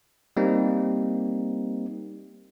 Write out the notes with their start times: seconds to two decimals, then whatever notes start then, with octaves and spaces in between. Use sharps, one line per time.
0.37 G3 A#3 C4 D#4